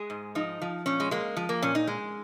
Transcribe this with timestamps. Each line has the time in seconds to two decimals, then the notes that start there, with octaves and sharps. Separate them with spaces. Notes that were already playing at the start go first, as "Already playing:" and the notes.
Already playing: G#3 G#4
0.10 G#2
0.35 F3 D#4
0.62 F3
0.86 A#2 C#4
1.00 G#3
1.11 G#3 A#3
1.37 F3
1.49 A#3
1.62 A#2 C#4
1.75 D#4
1.87 G#3